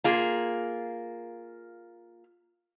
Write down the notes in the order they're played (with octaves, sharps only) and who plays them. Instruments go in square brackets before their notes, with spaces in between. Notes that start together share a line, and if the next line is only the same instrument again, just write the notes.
[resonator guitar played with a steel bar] A#3 F4 G#4